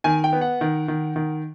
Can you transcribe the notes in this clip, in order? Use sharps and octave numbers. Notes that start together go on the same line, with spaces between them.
D#3 G#5
G5
B3
F#5
D#3
D#3
D#3